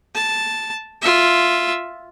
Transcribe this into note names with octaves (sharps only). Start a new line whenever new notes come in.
A5
F4 E5